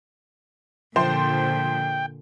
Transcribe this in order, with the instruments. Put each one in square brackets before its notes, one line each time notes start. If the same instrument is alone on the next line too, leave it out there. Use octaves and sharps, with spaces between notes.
[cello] A#2 D3 [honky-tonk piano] F3 C5 C6 [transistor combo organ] G5